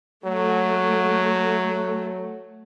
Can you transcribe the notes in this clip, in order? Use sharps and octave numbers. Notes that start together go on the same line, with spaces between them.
F#3 A3